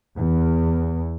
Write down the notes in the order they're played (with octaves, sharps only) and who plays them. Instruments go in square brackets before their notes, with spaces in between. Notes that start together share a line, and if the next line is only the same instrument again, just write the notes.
[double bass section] E2